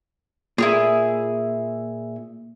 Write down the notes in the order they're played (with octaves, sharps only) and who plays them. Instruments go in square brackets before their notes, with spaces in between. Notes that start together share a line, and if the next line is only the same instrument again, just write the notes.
[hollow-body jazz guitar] A#2 [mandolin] E4 G4 G#4